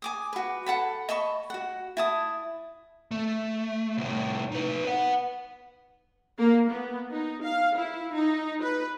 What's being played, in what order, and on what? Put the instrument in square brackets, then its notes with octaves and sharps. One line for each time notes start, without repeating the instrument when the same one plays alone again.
[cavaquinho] G#5 D6 D#6
F#4 B4
A4 F#5 A5 B5
D#5 A5 B5 C#6
F#4 F#5
E4 A5 D#6
[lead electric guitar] A3
C2 A2
D#4 B4
B4 F#5
[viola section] A#3
B3
D#4
F5
E4
D#4
B4